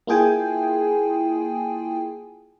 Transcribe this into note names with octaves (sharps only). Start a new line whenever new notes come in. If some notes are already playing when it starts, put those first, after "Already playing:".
A#3 E4 F4 G#4 G5 G#5